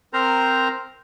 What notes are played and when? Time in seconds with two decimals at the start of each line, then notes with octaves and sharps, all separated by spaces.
0.13 C4 A#4 C5 A#5